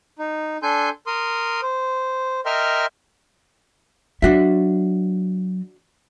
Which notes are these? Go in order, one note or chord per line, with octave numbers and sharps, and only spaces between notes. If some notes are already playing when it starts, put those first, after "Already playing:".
D#4
D4 A4 G#5 C6 G6
A#4 C6 D#6
C5
A#4 D#5 E5 G5 C6 F6
F#3 D4 F#4 E5